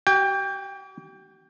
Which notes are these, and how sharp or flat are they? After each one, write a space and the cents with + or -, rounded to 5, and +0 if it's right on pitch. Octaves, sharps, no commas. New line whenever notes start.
G4 -45 G5 +20